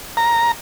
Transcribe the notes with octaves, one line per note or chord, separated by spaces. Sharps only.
A#5